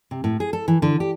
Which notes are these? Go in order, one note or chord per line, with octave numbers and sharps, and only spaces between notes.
C3
A2
G#4
A4
E3
D3
G4